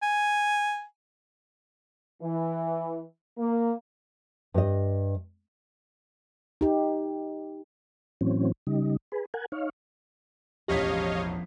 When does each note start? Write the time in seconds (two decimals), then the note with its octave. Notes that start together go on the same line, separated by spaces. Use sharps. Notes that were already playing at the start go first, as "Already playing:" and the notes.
0.03 G#5
2.22 E3
3.38 A#3
4.54 G2 D#5
6.61 D#4 G4
8.21 A2 E3 F#3 C4 C#4
8.67 C#3 G3 D#4
9.12 G#4 B4
9.34 A#4 F#5 G#5
9.52 D#4 C#5 F5
10.68 E1 A1 F3 G4 C#5 D#5 F5 B6